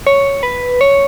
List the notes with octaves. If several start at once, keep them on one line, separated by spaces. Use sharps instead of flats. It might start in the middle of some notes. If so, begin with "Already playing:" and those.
C#5
B4
C#5